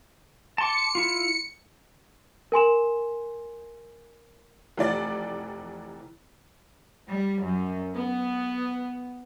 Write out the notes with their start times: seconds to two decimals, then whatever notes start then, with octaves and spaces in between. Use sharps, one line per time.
0.58 A5 C6 D6 C#7
0.95 E4 F4
2.52 A#4 G#5 C6 E7
4.77 F1 E3 D5 A6
7.08 G3
7.43 F#2
7.94 B3